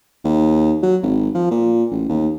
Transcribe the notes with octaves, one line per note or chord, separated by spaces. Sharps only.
D#2
F#3
G#1
F3
A#2
A1
D#2